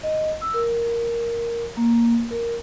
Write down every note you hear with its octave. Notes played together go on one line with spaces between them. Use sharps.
D#5
E6
A#4
A#3
A#4